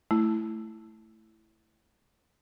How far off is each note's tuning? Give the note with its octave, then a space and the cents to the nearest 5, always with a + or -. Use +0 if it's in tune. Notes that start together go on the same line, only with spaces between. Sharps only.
A3 +0 E4 +0